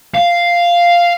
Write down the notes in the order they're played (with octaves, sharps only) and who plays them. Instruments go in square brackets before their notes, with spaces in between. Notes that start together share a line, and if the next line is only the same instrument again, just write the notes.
[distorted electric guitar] F5